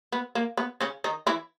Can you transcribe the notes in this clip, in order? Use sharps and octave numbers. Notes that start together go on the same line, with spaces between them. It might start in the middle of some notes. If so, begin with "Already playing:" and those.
B3
A#3
B3
C#3 C#4
D#3 D#4
E3 E4